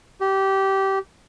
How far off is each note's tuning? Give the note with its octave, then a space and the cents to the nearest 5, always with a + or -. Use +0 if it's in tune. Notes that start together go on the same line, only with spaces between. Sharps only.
G4 -20